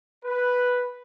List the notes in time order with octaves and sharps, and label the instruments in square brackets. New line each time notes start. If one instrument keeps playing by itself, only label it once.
[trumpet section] B4